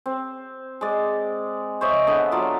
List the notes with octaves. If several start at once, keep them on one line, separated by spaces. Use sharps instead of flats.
C4
G#3 D5
C5 C#5 D#5 E5
D3 B3
F#3 F4 D5